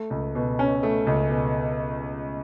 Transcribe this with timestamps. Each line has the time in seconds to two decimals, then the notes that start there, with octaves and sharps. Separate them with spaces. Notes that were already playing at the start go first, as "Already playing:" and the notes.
Already playing: A3
0.10 C#2
0.35 B2
0.59 C#4
0.83 A3
1.07 C#2
1.31 B2